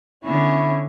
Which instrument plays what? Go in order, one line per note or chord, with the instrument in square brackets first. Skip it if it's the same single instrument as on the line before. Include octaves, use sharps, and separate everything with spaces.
[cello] D3 B3 [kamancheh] C#4 C#5 [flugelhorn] E4